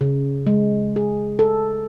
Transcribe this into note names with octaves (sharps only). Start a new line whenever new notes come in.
C#3
G#3
G#4
A4